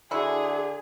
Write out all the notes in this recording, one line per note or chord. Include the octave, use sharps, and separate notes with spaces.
D3 E4 F#4 G#4